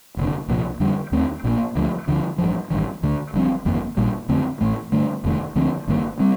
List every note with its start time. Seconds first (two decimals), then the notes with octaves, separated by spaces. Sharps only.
0.17 F1 D#2 D3
0.48 C2 A#2 F3
0.80 F2 D3 G3
1.12 D#2 D#3 A3 C4
1.44 A#1 A#2 F3 A#3
1.75 D2 D3 F3 A3
2.08 D2 D3 F3
2.38 A1 G2 F3
2.70 A1 G2 D#3
3.03 D2 D3 A3
3.34 G1 G2 F3 C4
3.65 G1 F2 D#3 A#3
3.97 A#1 A#2 G3
4.29 F2 D3 A3 C4
4.61 A1 A2 A3
4.92 G2 D3 A3
5.24 F1 F2 D#3 A3
5.55 D2 D3 F3 C4
5.87 G1 G2 D#3 A#3
6.20 G3 C4